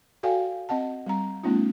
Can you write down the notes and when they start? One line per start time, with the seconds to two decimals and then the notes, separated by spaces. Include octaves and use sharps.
0.23 F#4 A4 D5 F5 G5 G#5
0.69 C4 D#5 F#5 A5
1.06 G3 C4 A#5
1.43 G3 A3 B3 C#4 D#4 F4